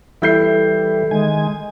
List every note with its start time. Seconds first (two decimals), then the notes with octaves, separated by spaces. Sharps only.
0.22 E3 G3 E4 A4 E5 G6 C7
1.11 D#3 G#3 G#5